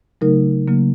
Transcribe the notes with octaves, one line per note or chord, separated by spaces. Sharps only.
C#3 F#3 A3 D#4 A#4
C#3 F#3 A#3